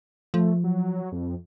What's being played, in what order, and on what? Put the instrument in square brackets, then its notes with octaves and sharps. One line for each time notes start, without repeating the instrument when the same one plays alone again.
[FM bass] F3 [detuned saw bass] A3
[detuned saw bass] F#3
F2